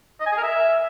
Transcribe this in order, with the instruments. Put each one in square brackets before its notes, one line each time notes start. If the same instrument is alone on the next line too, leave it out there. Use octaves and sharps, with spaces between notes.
[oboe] D#5
G#5
G#4
A#4
E5